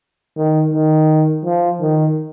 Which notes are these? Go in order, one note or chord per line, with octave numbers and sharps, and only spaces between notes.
D#3
D#3
F3
D#3